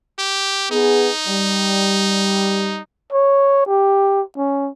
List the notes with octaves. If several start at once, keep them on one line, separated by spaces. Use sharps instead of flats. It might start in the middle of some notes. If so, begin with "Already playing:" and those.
G4
B3 D#4 G#4
G3
C#5
G4
C#4